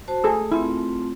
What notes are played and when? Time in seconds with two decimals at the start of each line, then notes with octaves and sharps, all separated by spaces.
0.08 F#4 C5 A5
0.24 A3 G#4 A4 E6
0.52 A3 C4 E4 F4